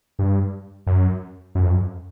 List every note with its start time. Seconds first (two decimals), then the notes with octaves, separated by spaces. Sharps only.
0.19 G2
0.87 F#2
1.55 F#2
1.63 F2
1.70 F#2